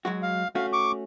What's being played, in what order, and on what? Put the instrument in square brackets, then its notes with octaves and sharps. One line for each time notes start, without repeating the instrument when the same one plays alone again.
[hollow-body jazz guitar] F#3 G#3 F#4
[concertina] F5
[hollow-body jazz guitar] A3 C#4 F#4 [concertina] F5
[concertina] C#6 D6